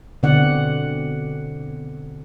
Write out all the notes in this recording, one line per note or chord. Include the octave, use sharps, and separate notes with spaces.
B2 D3 C4 D5 F#5